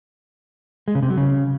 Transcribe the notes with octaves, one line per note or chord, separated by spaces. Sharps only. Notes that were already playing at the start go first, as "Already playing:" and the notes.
G#3
C#3
C3
F#3
C#3